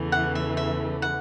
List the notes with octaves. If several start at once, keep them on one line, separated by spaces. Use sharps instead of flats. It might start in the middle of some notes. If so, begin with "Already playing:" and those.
Already playing: E2 C#3 E3 A3
F#5
E5
E5
F#5